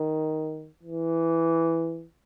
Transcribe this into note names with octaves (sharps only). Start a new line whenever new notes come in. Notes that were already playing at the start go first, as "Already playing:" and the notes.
Already playing: D#3
E3